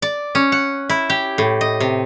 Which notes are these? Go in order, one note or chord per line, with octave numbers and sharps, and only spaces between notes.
D5
C#4
F#5
E4
G4
A2
D#5
C3